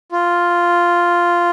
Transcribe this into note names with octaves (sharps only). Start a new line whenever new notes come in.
F4